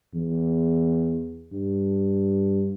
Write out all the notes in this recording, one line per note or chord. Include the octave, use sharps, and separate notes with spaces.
E2
G2